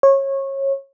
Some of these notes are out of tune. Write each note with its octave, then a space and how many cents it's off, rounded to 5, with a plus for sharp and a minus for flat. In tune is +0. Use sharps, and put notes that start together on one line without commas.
C#5 -25